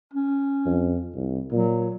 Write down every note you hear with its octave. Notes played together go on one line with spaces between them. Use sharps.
C#4
F2
C2
A#2 F#3